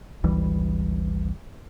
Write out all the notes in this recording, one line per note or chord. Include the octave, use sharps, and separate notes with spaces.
G#1 D2 E3 G3